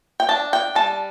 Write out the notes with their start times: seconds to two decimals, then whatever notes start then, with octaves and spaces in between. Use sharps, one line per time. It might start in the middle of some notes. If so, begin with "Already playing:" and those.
0.20 G5
0.29 D4 A5
0.53 G5
0.75 G3 A5